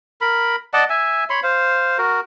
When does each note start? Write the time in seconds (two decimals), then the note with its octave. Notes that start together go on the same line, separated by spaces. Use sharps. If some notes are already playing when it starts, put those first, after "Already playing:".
0.21 A#4 B5
0.74 D5 D#5 F#5 A5
0.90 E5 G#5
1.30 C#5 B5 C6
1.43 C5 F5
1.98 F#4 A#4